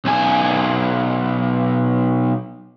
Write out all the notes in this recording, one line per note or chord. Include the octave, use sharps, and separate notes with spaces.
B1 G#5